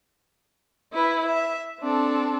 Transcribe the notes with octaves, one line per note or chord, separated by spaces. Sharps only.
E4 B4 B5
E5
C4 D4 A4